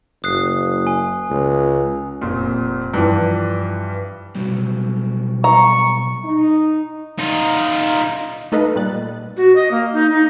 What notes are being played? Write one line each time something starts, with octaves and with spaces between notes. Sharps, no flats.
F#1 D#6 F#6 C7
G#5
C#2
F1 A#2
G2 E3 F3
B2 F#3 G3
A#5 C#6
D#4
D#4 F4
A3 D#4 A4 B4 D#5 F5
A#2 G3 F#6 A6
F#4
D#5
A#3
D#4
D#4